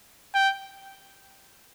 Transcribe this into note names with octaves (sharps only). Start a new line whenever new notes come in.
G5